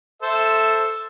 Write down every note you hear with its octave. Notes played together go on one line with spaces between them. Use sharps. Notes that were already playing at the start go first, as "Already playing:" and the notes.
A4 C5 E5